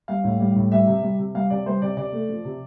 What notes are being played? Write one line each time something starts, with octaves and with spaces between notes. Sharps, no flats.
G3 F5
A2
G3
A2
G3 E5
C3
G3
C3
G3 F5
C3 D5
G3 C5
C3 D5
C3 D5
A3
F3
C3